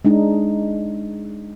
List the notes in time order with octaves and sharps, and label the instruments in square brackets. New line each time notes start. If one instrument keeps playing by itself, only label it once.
[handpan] G#3 D4 D#4